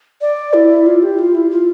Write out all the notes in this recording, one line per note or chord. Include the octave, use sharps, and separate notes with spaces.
D5
E4
F4
G4
F4
E4
F4